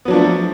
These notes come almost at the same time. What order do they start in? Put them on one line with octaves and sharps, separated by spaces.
B3 F#3 D4 F3 A3